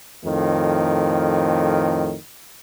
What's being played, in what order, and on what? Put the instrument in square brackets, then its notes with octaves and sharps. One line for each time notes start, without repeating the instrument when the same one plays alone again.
[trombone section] F2 A2 D#3